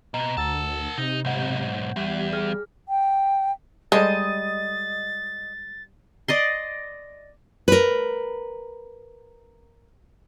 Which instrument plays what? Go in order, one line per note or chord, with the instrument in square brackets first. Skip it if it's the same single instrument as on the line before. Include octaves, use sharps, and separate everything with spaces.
[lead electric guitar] B2 [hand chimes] A#5
[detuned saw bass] D2 [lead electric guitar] A#4 A5 [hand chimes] F#5 E6 A6
[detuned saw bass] C3 [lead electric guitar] D#4
[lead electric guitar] B1 G#2 [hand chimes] F#5 G6
[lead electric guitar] E2 [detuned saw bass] G3
[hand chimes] G#4 F6
[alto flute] G5
[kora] G3 A4 C5 [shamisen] G#3 [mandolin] D#5 [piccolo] A6
[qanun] D5 D#5 C6
[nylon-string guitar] A#4 B4